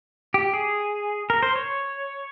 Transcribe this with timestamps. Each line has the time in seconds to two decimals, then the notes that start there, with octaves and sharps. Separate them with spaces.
0.34 G4
0.54 G#4
1.30 A#4
1.43 C5
1.56 C#5